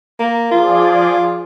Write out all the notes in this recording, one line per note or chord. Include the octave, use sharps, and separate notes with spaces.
A#3
F3 F4 G#4 D5